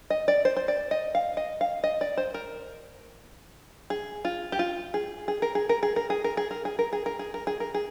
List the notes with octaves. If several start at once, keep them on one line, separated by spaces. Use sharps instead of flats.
D#5
D5
C5
C5
D5
D#5
F5
D#5
F5
D#5
D5
C5
A#4
G#4
F4
G4
F4
G#4
G#4
A#4
G#4
A#4
G#4
A#4
G#4
A#4
G#4
A#4
G#4
A#4
G#4
A#4
G#4
A#4
G#4
A#4
G#4